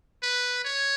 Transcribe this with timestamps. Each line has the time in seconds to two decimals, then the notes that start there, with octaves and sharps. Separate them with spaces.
0.23 B4
0.64 C#5